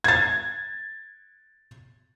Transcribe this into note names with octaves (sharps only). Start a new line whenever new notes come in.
G#6 A6